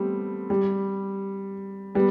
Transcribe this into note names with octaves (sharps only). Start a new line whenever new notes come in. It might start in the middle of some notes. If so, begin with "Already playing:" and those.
Already playing: G3 A3 B3 C4
G3
G3 B3